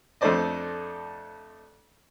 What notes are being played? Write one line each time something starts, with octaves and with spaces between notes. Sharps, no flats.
F2 A3 D4 C5 D5 D#5